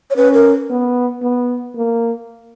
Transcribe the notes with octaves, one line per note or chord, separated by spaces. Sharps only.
C#5
C#4 B4
A#4
B3
B3
A#3